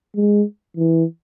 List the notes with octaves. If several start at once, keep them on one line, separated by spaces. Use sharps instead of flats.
G#3
E3